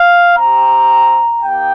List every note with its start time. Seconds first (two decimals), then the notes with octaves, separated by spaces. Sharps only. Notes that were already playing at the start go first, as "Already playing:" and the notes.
Already playing: F5
0.37 C4 G4 A#5
1.41 A#3 D#4 G4 G5